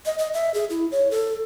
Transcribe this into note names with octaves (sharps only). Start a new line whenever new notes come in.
D#5
D#5
E5
G#4
E4
C#5
A4